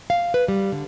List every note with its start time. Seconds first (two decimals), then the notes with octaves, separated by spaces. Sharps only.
0.10 F5
0.34 B4
0.48 G3
0.72 D3